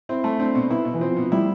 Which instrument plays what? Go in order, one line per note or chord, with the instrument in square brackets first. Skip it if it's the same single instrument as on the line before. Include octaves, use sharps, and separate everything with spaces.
[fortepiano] C4 [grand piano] E4
[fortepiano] A3
[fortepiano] C4 [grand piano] D4
[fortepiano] B2
[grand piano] B3 [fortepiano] E4
[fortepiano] B2
[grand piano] E3
[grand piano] F3 [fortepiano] C4
[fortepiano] B2
[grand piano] F3
[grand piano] G3 [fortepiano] E4